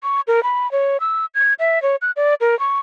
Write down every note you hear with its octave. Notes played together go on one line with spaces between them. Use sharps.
C#6
A#4
B5
C#5
E6
G#6
E5
C#5
F#6
D5
A#4
C#6